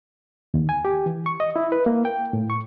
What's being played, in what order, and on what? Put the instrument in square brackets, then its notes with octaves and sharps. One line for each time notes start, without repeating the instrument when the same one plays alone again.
[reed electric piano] D#2
G#5
G4
E3
C#6
D#5
E4
B4
A#3
G5
A2
C#6